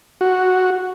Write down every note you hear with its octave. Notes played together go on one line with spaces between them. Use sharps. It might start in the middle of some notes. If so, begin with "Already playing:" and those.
F#4